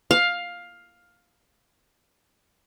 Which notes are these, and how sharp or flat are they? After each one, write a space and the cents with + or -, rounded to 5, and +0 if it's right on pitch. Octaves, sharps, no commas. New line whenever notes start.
F5 +10